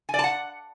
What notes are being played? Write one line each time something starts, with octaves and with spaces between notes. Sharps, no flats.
G#5
D5
A5
F#5